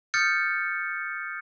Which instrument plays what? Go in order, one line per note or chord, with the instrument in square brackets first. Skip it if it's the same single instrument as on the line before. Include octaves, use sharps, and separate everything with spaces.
[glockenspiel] D#6 F6 G6 A6 C#7